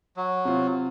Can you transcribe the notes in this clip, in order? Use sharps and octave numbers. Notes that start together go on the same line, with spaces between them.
F#3
C3 F4